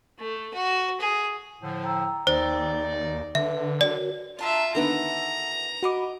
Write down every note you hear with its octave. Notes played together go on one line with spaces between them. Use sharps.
A3
F#4
G#4
A2 D3 F3
G5 A#5 E6
D#2 D#4 C5 D5
D3 B4 E5
F#4 A#4 C#5 D5
D4 F4 E5 A5 A#5
D3 D#3 B3 E4 F#4 A4 A#5
F#4 C#5 D#5 F#5 B5 D6